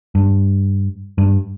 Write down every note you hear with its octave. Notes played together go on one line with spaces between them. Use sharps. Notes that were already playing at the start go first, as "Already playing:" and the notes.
G2
G2